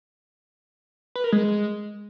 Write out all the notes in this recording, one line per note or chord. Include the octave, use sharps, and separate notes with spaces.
B4
A#4
G#3